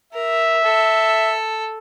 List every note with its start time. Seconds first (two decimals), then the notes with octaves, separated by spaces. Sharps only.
0.13 A#4 E5
0.64 A4